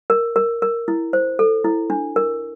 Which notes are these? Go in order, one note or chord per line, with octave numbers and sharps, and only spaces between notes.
A#4
A#4
A#4
E4
C5
A4
E4
D4
A#4